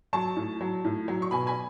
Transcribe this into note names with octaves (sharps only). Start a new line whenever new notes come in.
F#3 A5 C#6
A2
F#3
A2
F#3
C#6
B2 G#5 B5
G#5 B5